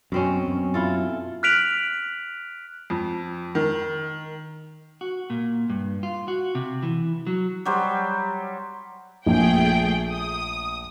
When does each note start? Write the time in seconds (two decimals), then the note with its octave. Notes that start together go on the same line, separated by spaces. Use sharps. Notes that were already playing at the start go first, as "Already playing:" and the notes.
0.12 F#2 B2 C4 C#4
0.48 F#2
0.74 E4 F4 A4
1.43 F6 F#6 B6 D7 F7 F#7
2.90 F2
3.55 D#3
5.01 F#4
5.30 A#2
5.70 G2
6.03 F4
6.28 F#4
6.55 C3
6.83 E3
7.27 F#3
7.65 F#3 G3 C5
9.26 A#1 A3 G#4 G5
10.11 D#6